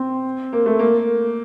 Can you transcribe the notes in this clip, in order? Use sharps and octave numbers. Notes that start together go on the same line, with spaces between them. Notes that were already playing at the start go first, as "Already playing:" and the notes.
Already playing: C4
A#3
A3
A#3